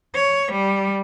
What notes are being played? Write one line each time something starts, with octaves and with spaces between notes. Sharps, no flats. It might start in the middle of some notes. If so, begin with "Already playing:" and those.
C#5
G3